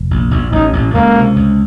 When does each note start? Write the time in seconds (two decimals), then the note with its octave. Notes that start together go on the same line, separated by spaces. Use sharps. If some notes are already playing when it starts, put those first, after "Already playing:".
Already playing: F1
0.11 A#1
0.31 A#1
0.52 A1 D#4
0.73 A1
0.94 C#2 A#3
1.16 C3
1.36 C#2